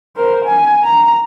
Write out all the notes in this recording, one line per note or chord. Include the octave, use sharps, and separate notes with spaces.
A#4 C5
G#5
A#5